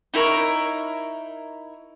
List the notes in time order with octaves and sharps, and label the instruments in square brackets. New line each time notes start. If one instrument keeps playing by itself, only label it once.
[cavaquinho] D#4 E4 A#4 C#5